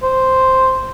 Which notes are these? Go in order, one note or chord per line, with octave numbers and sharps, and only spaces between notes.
C5